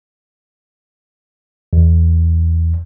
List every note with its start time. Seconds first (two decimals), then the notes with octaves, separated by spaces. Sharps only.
1.73 E2